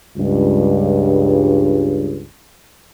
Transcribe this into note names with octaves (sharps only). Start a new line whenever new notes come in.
C#2 G2